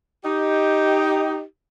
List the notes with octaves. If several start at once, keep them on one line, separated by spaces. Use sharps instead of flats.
D#4 G4